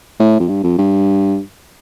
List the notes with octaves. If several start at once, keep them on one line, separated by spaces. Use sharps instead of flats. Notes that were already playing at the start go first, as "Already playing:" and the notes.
A2
F2
G2
F2
G2